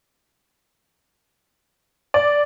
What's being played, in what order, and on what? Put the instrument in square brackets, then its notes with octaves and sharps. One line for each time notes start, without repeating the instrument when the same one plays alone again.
[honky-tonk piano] D5